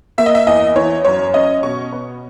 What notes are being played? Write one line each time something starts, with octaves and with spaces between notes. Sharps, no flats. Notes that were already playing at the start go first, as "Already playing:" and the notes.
A#3 E5
D#5
E5
E2 D#5
E3 C#5
F#2 C#5
C#4 D#5
B2 C#6
B3